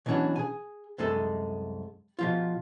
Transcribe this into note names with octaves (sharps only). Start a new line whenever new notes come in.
B2 E3 F#3 C#4 D4 F#4
G#4 G#5
C2 F#2 G#3 D#4 G#4 A4
B2 F3 F4